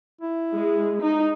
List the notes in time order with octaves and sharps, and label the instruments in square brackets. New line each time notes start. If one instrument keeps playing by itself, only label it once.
[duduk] E4
[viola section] G#3
D#4